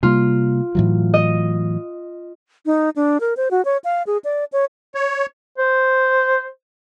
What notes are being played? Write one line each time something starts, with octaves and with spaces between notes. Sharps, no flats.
C3 G3 A#3 F4
A2 E3 F#3
D#5
D#4
D4
A#4
C5
F#4
C#5
F5
G#4
D5
C#5
C#5
C5